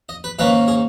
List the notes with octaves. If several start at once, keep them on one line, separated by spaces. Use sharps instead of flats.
D#5
B4
G#2 D#3 A#3 C#4 B4
G#4